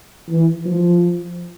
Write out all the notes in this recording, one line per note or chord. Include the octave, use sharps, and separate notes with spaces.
E3
F3